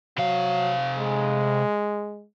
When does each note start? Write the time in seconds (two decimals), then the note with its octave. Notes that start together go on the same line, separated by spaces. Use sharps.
0.18 C3 F#3 F5
0.99 G#3